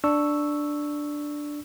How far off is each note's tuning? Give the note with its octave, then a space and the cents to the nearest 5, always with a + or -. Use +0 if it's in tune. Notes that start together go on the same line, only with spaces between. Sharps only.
D4 +0 C#6 +0 E6 +0